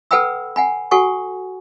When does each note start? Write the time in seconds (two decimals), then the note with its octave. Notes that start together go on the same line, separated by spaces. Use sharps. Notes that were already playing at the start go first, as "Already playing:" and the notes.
0.11 A4 B4 F#5 G5 B5 E6
0.56 F#5 G#5 B5
0.91 F#4 A4 F#5 G#5 C#6